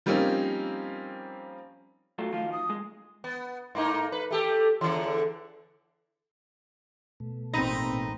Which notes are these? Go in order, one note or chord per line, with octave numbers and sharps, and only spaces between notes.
F3 G3 A#3 C4 C#4 D#4
F#3 A3 F4
D#3 F3 F4 F5
D#6
G#3
B3
G#2 A#3 D#4
B4
A3 G4 A4
E2 D3 E3
B2 A3
A1 A#2 C4 D#4 A#5 B5 A#6